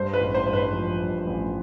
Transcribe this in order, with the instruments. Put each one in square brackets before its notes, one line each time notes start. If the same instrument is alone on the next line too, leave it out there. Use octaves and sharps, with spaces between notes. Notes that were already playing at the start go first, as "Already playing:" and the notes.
Already playing: [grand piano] G2 C5
B4
A1
C5
G2
B4
F3
G2
A1